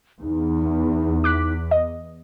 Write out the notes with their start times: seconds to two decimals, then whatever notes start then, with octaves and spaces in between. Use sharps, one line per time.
0.22 E2 D#4
1.24 D6 F#6 B6
1.71 D#5